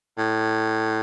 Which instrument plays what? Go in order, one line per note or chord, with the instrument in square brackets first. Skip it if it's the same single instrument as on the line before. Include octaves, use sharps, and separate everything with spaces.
[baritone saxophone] A2